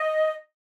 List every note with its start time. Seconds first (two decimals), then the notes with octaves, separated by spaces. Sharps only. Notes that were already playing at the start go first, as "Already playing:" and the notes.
Already playing: D#5